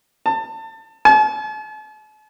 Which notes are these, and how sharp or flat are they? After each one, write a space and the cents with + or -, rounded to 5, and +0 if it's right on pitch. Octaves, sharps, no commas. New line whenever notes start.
A5 +25
A5 -45